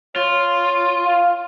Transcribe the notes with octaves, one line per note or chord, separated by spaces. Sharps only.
F4 C#5
F5